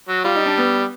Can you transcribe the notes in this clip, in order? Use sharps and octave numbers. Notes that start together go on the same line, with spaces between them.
F#3
G3 F4
D#4
D4
B3